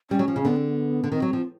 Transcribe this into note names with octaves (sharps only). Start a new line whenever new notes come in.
G3 C#4
F#3
F3
C#3
D3 B3
C4
B3
D3
D#3 C4
F#3
F3